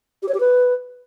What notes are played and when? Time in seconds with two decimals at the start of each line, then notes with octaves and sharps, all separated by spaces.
0.22 G4
0.28 C#5
0.34 G4
0.40 B4